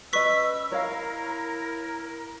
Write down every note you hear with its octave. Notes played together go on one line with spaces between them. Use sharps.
C#4 B4 D#5 B5 C#6 E6 B6
E4 A#4 C#5 F5